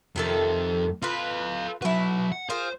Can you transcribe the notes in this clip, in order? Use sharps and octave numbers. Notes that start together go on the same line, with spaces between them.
F2 C3 D#3 A4
F4 A4 B4 F5
F#3 E4 F#4 B4
F#5
F4 G#4 A#4 C5